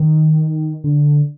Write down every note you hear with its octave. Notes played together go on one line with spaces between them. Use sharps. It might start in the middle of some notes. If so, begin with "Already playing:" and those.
Already playing: D#3
D3